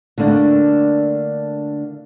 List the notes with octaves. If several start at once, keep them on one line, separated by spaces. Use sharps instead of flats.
D3 A3 A#3 D4